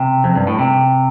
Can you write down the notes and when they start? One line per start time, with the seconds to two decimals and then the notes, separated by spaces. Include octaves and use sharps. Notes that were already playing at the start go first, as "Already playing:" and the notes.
Already playing: C3
0.24 F2
0.36 G2
0.47 A2
0.59 C3